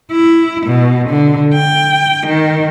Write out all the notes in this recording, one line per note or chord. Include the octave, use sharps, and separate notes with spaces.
E4
B2
D3
G5
D#3